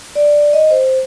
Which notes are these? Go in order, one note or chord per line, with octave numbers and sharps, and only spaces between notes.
D5
D#5
C5